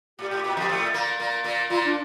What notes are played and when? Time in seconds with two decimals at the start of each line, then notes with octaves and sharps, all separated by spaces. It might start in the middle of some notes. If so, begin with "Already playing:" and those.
0.19 A2 G4
0.31 A2
0.44 A#2
0.57 F2 F3
0.69 A2 A3
0.94 A#2 A#3
1.19 A#2 A#3
1.44 A#2 A#3
1.70 A#2 A#3 F4
1.84 D4